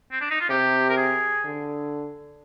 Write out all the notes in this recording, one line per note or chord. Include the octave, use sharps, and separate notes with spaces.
C4
D4
D#4
F4
C3 G4
A#4
G#4
D3